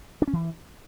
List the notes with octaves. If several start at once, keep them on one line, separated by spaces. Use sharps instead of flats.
D4
C#4
E3